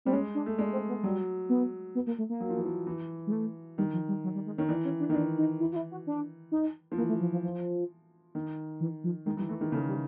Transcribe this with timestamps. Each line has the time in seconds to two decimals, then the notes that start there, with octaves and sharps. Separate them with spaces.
0.05 G3 C4
0.13 G#3 C#4
0.35 D4
0.46 A3
0.58 G#3 D4
0.72 C4
0.88 B3
1.03 F#3 G3
1.49 B3
1.95 B3
2.07 A#3
2.18 A3
2.29 A#3
2.40 F#3
2.49 F3
2.57 E3
2.65 F3
2.87 E3
3.27 G#3
3.32 A3
3.78 D#3 G3
3.93 F3
4.08 G3
4.24 F#3
4.35 G3
4.46 G#3
4.57 D#3 C#4
4.68 E3 D4
4.84 C#4
5.00 D4
5.09 D#3 D#4
5.14 E3 D4
5.38 D#4
5.60 E4
5.72 F4
5.76 E4
5.91 F#4
6.07 D4
6.52 D#4
6.92 F3
6.97 E3 A#3
7.09 A3
7.21 F3
7.32 F3
7.43 F3
8.35 D#3
8.80 E3
9.04 F3
9.26 D#3 G#3
9.37 E3 G3
9.49 E3 A3
9.60 D#3 G#3
9.72 C#3 A3
9.88 G3